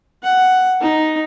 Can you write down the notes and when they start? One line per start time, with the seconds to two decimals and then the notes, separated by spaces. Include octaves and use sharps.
0.23 F#5
0.81 D#4